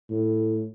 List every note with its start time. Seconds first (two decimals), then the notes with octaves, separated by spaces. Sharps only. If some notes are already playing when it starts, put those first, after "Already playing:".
0.10 A2